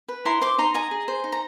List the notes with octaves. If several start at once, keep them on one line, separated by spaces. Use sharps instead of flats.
B4
E4 A#5 C6
C5 C6 D6
D#4 A#5 C6
D#5 G#5 A#5
G#4
C5
D#4
A#5